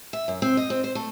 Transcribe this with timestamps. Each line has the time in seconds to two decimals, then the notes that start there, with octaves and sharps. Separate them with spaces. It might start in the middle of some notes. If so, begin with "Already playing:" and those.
0.13 E5
0.28 F#2
0.42 C4
0.57 D#5
0.70 C4
0.84 C5
0.95 A3